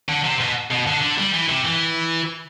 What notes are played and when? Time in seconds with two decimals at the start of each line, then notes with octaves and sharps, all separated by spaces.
0.09 D3
0.25 C3
0.40 B2
0.71 B2
0.87 D3
1.02 D3
1.18 G3
1.34 E3
1.49 C3
1.65 E3